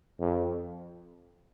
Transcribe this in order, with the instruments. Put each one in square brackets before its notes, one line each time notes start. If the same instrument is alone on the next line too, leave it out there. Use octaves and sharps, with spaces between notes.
[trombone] F2